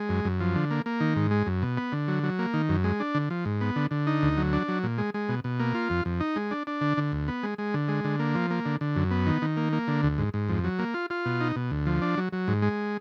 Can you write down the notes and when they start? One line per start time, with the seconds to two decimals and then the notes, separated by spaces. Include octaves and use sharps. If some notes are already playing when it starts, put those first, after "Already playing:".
Already playing: G#3
0.09 F#2
0.25 F#2
0.40 F3
0.56 D3
0.71 A#3
0.86 A#3
1.00 D#3
1.16 G#2
1.31 G#3
1.47 F#2
1.62 B2
1.77 B3
1.92 D3
2.08 F#3
2.23 F#3
2.39 A#3
2.54 D#3
2.69 F#2
2.84 G#3
3.00 D4
3.15 D3
3.30 F3
3.45 G#2
3.61 B3
3.76 D3
3.91 D3
4.07 D#4
4.22 D2
4.37 F#3
4.53 D4
4.68 F#3
4.83 A#2
4.98 G#3
5.14 G#3
5.29 B2
5.44 B2
5.60 A#3
5.74 F4
5.90 F2
6.05 F2
6.20 D#4
6.36 G#3
6.51 D4
6.67 D4
6.81 D3
6.97 D3
7.12 D2
7.28 B3
7.43 G#3
7.58 G#3
7.74 D3
7.88 G#3
8.04 D3
8.19 A#3
8.35 F3
8.51 A#3
8.66 D3
8.81 D3
8.96 F#2
9.11 B3
9.26 D#3
9.42 D#3
9.57 A#3
9.73 A#3
9.88 D3
10.03 D2
10.18 G#2
10.34 G#2
10.49 F2
10.64 F#3
10.79 A#3
10.94 F4
11.10 F4
11.25 B2
11.40 D#4
11.56 B2
11.71 D2
11.86 F3
12.02 D4
12.17 F#3
12.33 F#3
12.48 G#2
12.62 G#3